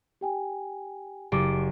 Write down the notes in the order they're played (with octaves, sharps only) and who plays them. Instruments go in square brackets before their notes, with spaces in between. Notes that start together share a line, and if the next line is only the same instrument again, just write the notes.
[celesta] G4 G5 G#5
[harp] F#1 [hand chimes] G4 [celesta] D6 D7